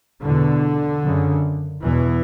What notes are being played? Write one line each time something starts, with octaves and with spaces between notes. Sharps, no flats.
E2 B2 D3
F#2 C#3
E2 B2 E3